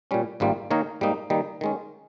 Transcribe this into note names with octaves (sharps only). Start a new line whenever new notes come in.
A#2 G3 C#4
G#1 G#2 G3 A#3 F4
D#3 A#3 D#4 A#4 C#5
G#2 G3 A#3 D#4
D#3 G3 A#3 D#4
D#3 G#3 C#4